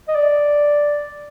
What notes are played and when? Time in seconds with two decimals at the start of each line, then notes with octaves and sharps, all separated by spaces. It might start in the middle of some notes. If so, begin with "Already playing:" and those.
0.08 D#5
0.15 D5